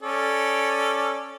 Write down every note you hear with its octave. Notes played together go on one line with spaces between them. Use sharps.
C#4 A4 D5